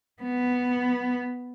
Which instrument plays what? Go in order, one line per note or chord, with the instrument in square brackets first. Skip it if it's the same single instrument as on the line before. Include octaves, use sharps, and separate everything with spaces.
[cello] B3